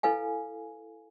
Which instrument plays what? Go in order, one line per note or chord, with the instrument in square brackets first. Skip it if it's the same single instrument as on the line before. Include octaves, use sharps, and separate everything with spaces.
[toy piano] E4 A4 B4 F5 G#5